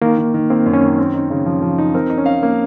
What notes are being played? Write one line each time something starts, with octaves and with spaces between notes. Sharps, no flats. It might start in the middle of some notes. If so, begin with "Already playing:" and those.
D#3 A#3
D#3
D#3
A#3 C4
F#2
C#4
D#3
C4
D#4
C#3
F3
F3
D#4
C4 A#4
D#4
C#4
F5
A#3